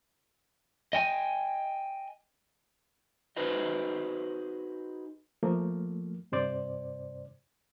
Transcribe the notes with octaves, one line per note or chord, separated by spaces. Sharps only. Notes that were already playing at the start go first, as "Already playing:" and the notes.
D#5 G5 G#5
D#4 F#4 G#4 B4 C5 D#5
F3 A3 A#3
G2 C3 C5 D5